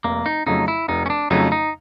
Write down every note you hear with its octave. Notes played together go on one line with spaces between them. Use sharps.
F1 A#3
D#4
F2 C#3 F#3 A3 D#4
E4
F1 D#4
C#4
D4
F2 C#3 F#3 A3 D#4
D#4